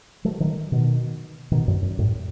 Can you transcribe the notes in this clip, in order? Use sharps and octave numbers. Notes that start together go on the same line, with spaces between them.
F#3 A3
D#3 F#3
B2 D#3
B2 D#3
F#2
F#2
F#2 A2